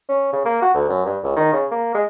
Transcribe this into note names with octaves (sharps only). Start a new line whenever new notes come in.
C#4
C#3
A#3
F#4
D2
F#2
G2
C#2
D#3
C#3
A#3
G#3